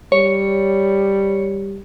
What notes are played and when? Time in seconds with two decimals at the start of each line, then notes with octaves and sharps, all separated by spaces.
0.12 G3 C#5